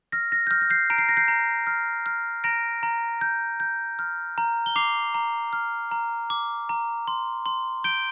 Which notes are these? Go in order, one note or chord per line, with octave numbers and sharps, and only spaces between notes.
F6 A#6
A#6
G6
F6 A#6
A#6
G6 C7
A#5 D7
C7
A#6
G6 C7
A#5
F6
F6
A#5 A#6 D7
A#5
G6
G6
F6
A#5
G7
D6 C7 F7
A#5
F6
A#5
D6
A#5
C6
C6
G6 D7 G7